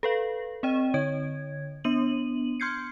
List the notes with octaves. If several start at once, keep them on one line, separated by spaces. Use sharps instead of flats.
A4 B4 F5
C4 D#5 G5 D#7
D3 C#5 G#6
B3 D4 D#7 F#7
C6 F6 G6 G#6 C7 C#7